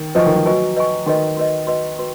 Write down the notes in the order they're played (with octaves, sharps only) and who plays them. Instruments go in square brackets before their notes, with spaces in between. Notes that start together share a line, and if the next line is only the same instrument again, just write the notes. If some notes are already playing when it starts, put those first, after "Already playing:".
Already playing: [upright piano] D#3
[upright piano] F3 [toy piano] B4 D#5 G#5 C#6
[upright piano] D#3
F3
[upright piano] F#3 [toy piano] B4 D#5 G#5 C#6
[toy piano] B4 D#5 G#5 C#6
[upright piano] D#3 [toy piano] F#4 B4 D#5
[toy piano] F#4 B4 D#5
F#4 B4 D#5
F#4 B4